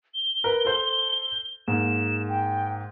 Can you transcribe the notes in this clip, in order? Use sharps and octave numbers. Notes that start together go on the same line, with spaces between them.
G7
A#4 B4
A4 C5
G#2 A#3 E7
G5